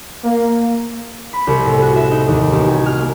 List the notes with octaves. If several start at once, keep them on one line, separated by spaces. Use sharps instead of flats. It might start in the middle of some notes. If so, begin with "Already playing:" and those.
A#3
B5
C2
A2
F#4
E5
D#4
D#2
A1
G#5
F6
A#3